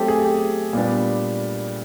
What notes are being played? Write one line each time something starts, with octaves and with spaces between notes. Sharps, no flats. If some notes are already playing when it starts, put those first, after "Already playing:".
Already playing: F#3 A3 C4 G4 A4
G#4
G4
A#2 G3 B3 D4